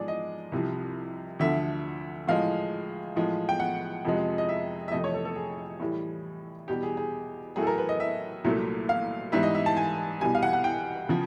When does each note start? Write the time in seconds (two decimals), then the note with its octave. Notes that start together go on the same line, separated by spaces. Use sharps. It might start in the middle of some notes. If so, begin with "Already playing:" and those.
Already playing: G#2 F3 G#3 G#4 D5
0.08 D#5
0.52 C2 C3 F3
1.39 D2 D3 F3 E5
2.27 A2 F3 G#3 F5
3.16 A2 F3 G#3
3.49 G5
3.60 F#5
4.05 F2 C3 F3 G#3
4.38 D#5
4.49 E5
4.88 E5
4.92 F2 C3 F3 A3 D#5
5.04 C#5
5.14 A4
5.25 A4
5.36 G#4
5.80 A2 E3 G3
6.68 E2 B2 G3 G4
6.83 G#4
6.97 G#4
7.56 A2 F#3 A3 G#4
7.63 A4
7.67 A#4
7.78 B4
7.89 D#5
8.00 E5
8.44 C2 A#2 F#3 A3
8.89 F5
9.32 G#2 E3 G3 E5
9.43 D#5
9.55 E5
9.66 A5
9.77 G#5
10.20 C2 B2 G3 G#5
10.35 F5
10.43 F#5
10.53 F#5
10.64 G5
11.09 C#3 F3